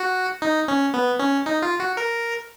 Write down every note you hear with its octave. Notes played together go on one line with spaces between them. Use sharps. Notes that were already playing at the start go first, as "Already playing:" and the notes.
Already playing: F#4
D#4
C#4
B3
C#4
D#4
F4
F#4
A#4